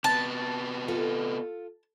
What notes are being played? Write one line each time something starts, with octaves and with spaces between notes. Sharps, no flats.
C3 B3 A5
F4 A4